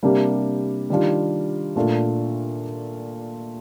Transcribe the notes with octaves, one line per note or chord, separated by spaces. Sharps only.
C3 G3 A#3 D4
D#3 G3 D4 F4
A#2 A3 D4 F4